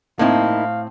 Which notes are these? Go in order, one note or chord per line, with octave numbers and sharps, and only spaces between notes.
A2 A#3 C4 D#4 E4 F5